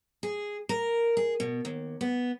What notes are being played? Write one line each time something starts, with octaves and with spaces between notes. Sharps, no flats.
G#4
A#4
G#4
B2
D#2
B3